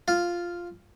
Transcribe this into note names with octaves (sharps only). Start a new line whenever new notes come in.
F4